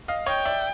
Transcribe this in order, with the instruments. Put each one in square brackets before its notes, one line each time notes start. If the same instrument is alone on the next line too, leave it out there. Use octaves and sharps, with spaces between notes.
[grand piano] D#5 F5
[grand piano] C#5 D#5 [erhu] G5
[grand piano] D5 E5